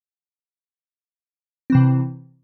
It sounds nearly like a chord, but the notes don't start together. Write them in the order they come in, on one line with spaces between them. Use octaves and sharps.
C4 E3 C3